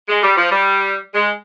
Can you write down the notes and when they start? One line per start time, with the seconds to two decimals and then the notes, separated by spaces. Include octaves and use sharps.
0.09 G#3
0.22 G3
0.37 F3
0.50 G3
1.14 G#3